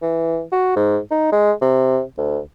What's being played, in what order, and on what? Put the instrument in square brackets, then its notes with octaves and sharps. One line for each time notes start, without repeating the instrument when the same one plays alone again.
[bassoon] E3
F#4
G#2
D#4
G#3
C3
D2